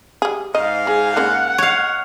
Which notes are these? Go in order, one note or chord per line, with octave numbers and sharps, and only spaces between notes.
G3 G#4
G#2 D#5 F5
G#3 G#4
C#3 G#3 A#3 F#5
C#5 F5